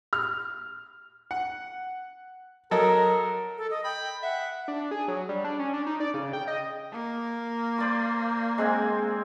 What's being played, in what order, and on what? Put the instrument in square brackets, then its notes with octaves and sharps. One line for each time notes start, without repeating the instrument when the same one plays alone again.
[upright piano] F6
[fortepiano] F#5
[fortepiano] F#3 A4 D#5 [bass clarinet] A#4
[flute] A4
D#5
[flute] G5 [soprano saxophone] B5
[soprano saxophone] E5 [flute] F#5
[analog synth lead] D4
G#4
F#3
G3
D4
C#4
D4
D#4
D5
C#3
G5
D#5
[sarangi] A#3
[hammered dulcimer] C5 D5 D6
G#3 C4 G#5